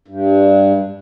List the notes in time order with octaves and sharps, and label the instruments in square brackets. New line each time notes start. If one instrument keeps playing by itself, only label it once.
[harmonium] G2